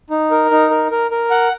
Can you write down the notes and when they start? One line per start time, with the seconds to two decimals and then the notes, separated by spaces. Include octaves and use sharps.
0.10 D#4
0.31 A#4
0.51 D#4
0.71 A#4
0.91 A#4
1.11 A#4
1.31 F#5